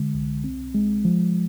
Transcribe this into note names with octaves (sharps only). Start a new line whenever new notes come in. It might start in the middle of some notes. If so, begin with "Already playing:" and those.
Already playing: D3 G#3
C2
C4
G#3
F3